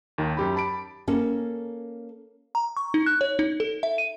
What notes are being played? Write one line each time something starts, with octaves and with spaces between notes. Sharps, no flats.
D#2 D#3
F#2 G4 B5
A5 B5 D6 D7
A#3 C#4 A4
A#5
C#6
D#4
F#6
C#5
D#4
A4
E5
D#7